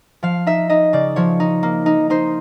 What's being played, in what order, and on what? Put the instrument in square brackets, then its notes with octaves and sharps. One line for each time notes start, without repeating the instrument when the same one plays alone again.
[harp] F3 F5
D#4 E5
D#4 D#5
C#3 D5
F3 C#5
D#4
A#3
D#4
D#4 C5